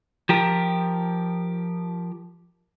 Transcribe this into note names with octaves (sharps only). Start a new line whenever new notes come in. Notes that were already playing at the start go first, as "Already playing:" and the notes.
F3 G4 A#4